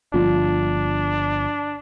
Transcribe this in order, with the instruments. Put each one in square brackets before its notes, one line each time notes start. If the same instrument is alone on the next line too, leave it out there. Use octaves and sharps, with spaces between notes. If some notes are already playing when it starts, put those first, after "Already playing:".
[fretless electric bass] G1 [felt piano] F3 [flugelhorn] D4